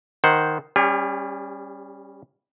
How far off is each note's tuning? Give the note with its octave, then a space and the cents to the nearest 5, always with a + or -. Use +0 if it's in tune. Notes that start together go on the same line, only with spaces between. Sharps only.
D#3 +0 C5 +0 F#5 +0
G3 +0 C#4 +0 G4 +45